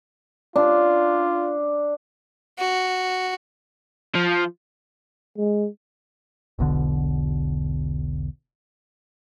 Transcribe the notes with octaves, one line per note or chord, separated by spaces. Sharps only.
D4 F4
F#4
F3
G#3
E1 B1 B2 D3